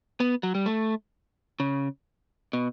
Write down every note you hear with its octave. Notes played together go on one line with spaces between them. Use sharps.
B3
F#3
G3
A3
C#3
B2